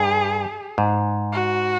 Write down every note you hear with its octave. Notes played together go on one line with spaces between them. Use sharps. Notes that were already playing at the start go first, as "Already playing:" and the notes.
Already playing: G2 G#4
G#2
F#4